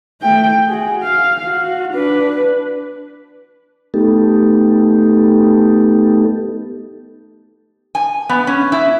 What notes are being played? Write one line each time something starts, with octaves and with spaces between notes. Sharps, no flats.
A3 G5
F#4 G#4
F5
F#4
D4 B4
A3 B3 D#4 G4 A4
G#5
B3
C#4
E4